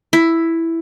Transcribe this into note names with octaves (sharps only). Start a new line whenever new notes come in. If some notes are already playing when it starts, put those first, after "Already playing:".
E4